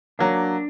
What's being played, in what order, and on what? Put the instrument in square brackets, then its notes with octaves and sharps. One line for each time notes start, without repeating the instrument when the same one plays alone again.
[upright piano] F#3 A#3 [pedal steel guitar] D4